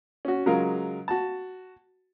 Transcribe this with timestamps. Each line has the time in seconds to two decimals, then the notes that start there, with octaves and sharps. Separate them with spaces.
0.25 C#4 F#4
0.46 C#3 F#3 G#3 F4 A#4
1.08 F#4 A5